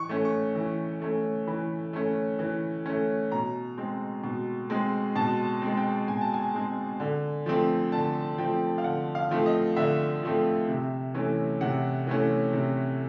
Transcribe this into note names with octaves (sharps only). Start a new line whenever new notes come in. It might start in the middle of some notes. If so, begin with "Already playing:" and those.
Already playing: E3 C#6
A3 C#4
C#6
E3
A3 C#4
E3 B5
A3 C#4
E3
A3 C#4
B2 A#5
G#3 C4
B2
G#3 C4
B2 A5
G#3 C4
G5
B2 G#5
A5
G#5
G#3 C4
D3
F3 A3 C4
D3 A5
F3 A3 C4 G5
F5
D3 F#5
F5
F3 A3 C4
D#5
D3 E5
F3 A3 C4
C3
E3 A3 C#4
C3 F#5
E3 A3 C#4
C3